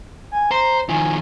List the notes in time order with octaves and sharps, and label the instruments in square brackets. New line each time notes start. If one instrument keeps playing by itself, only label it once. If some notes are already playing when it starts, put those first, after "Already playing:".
[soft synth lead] G#5
[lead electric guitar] C5 [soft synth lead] A#5
[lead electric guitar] D#3 F3 [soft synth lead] G#5